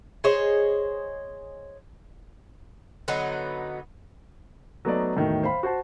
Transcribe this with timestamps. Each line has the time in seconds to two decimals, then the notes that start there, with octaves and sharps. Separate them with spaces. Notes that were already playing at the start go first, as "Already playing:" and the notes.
0.24 G#4 C5 C#5 D#5
3.08 D3 F#3 B3 D#4
4.85 F#3 A3 B3 D#4 A4 D5
5.16 E2 A2 D#3 F#3
5.43 C5 F5 B5
5.63 F#4 C5 A5